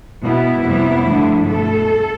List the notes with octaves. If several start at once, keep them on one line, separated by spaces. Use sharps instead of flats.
B2 B3 E4
F2 C3 G3 B3
G2 D3 F3 A3
B2 A3 A4